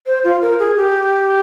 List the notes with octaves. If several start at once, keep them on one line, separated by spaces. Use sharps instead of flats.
C5
F4
A#4
G#4
G4